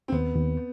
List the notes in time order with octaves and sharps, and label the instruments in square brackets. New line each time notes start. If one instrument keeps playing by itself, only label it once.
[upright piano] C4
[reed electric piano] D#2 [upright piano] B3
[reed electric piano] D#2